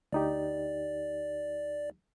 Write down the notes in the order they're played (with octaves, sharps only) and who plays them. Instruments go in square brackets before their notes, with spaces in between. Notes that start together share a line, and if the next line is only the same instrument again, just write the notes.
[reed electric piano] D2 D#4 G4 [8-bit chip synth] D5